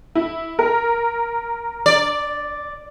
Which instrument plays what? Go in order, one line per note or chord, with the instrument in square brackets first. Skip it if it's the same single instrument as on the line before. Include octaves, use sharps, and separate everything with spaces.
[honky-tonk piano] E4
A#4
[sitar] D5